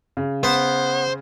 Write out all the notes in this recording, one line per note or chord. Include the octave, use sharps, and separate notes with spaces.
C#3
B3 C5